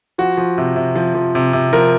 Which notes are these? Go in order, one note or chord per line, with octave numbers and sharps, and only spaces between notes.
F3 F#4
F3
C3
C3
F3
F3
C3
C3
F3 A#4